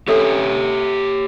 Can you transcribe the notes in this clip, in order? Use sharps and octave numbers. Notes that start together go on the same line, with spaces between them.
G4 A4 C#5 E5 E6